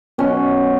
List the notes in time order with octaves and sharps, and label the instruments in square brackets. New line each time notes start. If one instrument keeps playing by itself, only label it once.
[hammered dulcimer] B2 F#3 C#4